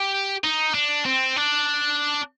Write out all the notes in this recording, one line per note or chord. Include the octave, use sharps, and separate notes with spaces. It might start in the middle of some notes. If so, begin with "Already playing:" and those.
Already playing: G4
D#4
D4
C4
D4